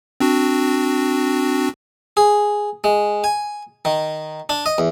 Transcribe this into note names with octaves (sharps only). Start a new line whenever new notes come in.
C4 D4 F#4
G#4
G#3
G#5
D#3
D4
D#5
E2